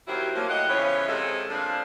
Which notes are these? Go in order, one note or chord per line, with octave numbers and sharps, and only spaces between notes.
D#3 F#3 C4 E4 F#4 G4
F3 F#3 A#3
A2 G4 D#5 F#5
C#3 E3 F3 B3 C#5
C3 G#3 C4 A4
F3 G3 A#3 C4 D4